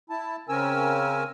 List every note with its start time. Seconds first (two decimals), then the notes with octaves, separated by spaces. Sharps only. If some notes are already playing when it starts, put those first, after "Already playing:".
0.10 E4 A5
0.49 C#3 C4 C#4 A#4 G#5 E6